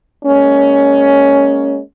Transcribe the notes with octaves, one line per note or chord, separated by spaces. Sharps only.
G#3 A#3 C#4